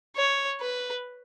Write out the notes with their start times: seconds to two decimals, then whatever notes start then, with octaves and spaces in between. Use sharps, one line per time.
0.16 C#5
0.61 B4